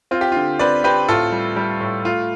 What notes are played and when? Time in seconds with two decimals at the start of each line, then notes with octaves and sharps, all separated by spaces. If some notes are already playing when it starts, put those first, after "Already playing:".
0.11 C4 F4
0.21 G4
0.32 D3 F4
0.59 C4 B4 D5
0.84 C4 G4 B4
1.09 A2 F4 A4
1.32 G3
1.56 G3
1.81 A2
2.05 A3 F4